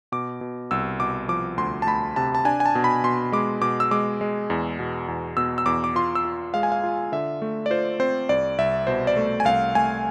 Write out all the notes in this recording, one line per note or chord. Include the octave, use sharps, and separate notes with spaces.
B2 D6
B2
C2 E6
B2 D6
F3 D6
D2 C6
A5
D2 B5
C3 A5
A5
D4 G#5
G#5
A5
B2
B5
B2 C6
G#3 D6
B2 D6
E6
G#3 D6
G#3
E2
B2
E2
B2 E6
E6
E2 D6
D6
F4 C6
E6
F4
G#3 F5
G#5
F5
F4
D3 E5
A3
D5
F4 C5
C4 C5
C2 D5
C2 E5
B2 C5
D5
A3
G#5
C2 F5
A3 G#5